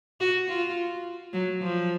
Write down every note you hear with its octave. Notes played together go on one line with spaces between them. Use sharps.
F#4
F4
F#3
F3